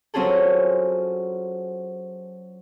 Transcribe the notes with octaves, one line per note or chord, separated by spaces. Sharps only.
F#3 C4 C#4 F4 G#4 A4